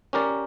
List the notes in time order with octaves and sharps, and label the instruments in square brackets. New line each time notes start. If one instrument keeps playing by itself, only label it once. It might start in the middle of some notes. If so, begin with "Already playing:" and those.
[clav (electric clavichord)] C#4 G4 A#4 D5